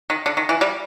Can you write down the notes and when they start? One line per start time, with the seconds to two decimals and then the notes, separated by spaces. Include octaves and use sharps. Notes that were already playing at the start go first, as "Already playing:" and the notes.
0.10 D#3
0.26 D3
0.37 D#3
0.49 E3
0.61 G3